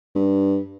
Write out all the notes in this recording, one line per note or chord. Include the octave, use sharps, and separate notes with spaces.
G2